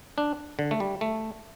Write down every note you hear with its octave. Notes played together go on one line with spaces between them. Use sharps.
D4
D3
A3
G3
A3